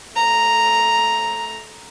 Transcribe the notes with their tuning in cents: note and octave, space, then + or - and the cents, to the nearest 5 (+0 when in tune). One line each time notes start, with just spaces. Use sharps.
A3 -15 A#5 +0